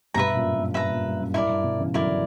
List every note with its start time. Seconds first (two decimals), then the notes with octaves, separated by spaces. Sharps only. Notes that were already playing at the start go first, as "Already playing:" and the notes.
0.14 G2 B2 B4 E5 A#5
0.35 F#2 A#2
0.55 G2
0.74 G2 B4 E5 A#5
0.89 F#2 A#2
1.05 G2
1.19 F#2
1.34 G2 E4 A#4 D5
1.49 G2
1.64 G2 B2
1.79 C#3 E3
1.94 D3 F#3 E4 A#4 D5